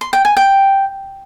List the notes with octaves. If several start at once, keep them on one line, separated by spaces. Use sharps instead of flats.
C6
G5
G#5
G5